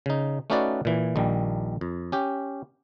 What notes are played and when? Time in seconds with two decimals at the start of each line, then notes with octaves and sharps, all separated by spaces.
0.06 C#3 D#4
0.50 A3 C#4 D#4 F#4 B4 D5
0.85 A#2 E3
1.16 A#1 D#3 G3
1.81 F2
2.12 C#4 G4